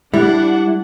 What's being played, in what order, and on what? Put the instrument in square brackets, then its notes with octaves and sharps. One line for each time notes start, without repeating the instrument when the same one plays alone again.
[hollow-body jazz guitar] G3 [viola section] D4 F#5 [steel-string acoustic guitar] E4